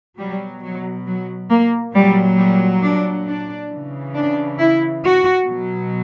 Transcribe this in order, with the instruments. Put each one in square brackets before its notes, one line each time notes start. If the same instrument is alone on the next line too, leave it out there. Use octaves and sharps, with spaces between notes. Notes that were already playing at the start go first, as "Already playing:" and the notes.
[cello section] B2 F#3 G3
F#3
F#3
A#3
A#2 F#3 G3
G3
D4
D4
C#3 E3
D4
E4
F#4
B2 F#3